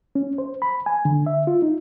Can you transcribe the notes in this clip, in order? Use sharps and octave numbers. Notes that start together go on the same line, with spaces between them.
C#4
C5
B5
G#5
D3
E5
F4
D#4